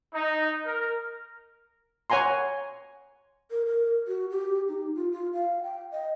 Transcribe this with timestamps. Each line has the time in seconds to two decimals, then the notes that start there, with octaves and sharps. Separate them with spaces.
0.14 D#4
0.65 A#4
2.10 C#5 F#5 G#5 A#5 C6
3.51 A#4
3.66 A#4
4.08 F#4
4.30 G4
4.68 D#4
4.95 F4
5.12 F4
5.33 F5
5.63 G5
5.92 D#5